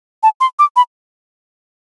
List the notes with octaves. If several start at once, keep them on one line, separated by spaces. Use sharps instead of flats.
A5
C6
D6
B5